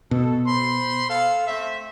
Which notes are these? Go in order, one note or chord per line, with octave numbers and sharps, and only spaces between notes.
B2 A4
C5 B5 C6
A4 F5
A3 C4 E5